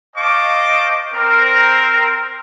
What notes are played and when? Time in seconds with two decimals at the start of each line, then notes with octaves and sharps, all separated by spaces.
0.16 C5 D#5 F5 A5 C#6 D6
1.14 C4 A#4